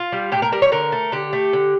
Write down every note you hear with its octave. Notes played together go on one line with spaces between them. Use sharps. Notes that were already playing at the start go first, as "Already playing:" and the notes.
Already playing: F4
G3
A2 G4
A#4
G3 A#4
C#5
D3 A#4
A3
D3 G4
A3
D3